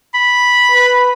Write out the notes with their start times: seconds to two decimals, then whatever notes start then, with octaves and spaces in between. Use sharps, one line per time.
0.14 B5
0.72 B4